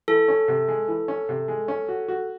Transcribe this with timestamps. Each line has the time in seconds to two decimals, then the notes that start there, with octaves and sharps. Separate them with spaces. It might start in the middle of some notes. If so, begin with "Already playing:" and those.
0.08 E3 A4
0.28 C#4
0.48 C3
0.68 G#3
0.88 E3
1.08 C#4
1.29 C3
1.48 G#3
1.68 C#4
1.88 F#4
2.08 F#4